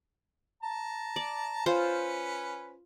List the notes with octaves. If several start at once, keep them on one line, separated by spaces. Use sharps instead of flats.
A5 A#5
D5
C#4 F4 B4 C5